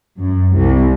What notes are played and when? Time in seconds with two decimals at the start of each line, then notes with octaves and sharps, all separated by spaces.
0.19 F#2
0.54 C2